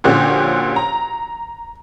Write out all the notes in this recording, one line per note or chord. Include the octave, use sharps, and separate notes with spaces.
A#2 D3 F3 C#4 F#4 G4
A#5